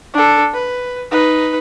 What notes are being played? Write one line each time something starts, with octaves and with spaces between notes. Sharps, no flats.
D4 A4
B4
D#4 B4